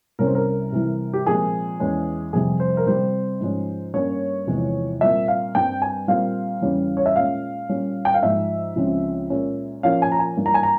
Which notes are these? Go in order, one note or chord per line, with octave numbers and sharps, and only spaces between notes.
C2 C3 G3 C#4 A#4
C5
A#4
C3 E3 G3
G4
A#2 F3 G#3 C4 G#4
E2 E3 G#3 C#4
F2 C3 G3 G#4
C5
A#4
C3 G3 C4 C5
G#2 F3 G#3 C#4
G2 G3 A#3 C#4 C#5
E2 C3 F3 G#3
A#2 G3 C4 E5
F5
G2 G3 C4 G5
G#5
A#2 G3 C4 F5
E2 C#3 G3 C#4
C#5
E5
A#2 G#3 C#4 F5
A#2 G3 C#4
G5
F5
G#2 F3 G#3 E5
C#2 C#3 F3 G#3 C4
A#2 G#3 C#4
A#2 F3 A#3 C#4 F5
G#5
A#5
G#5
G2 E3 A#3
A#5
G#5
A#5